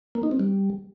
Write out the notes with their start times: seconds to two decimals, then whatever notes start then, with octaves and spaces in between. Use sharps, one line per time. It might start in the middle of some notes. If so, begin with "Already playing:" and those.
0.15 A#3
0.23 D#4
0.31 C4
0.40 G3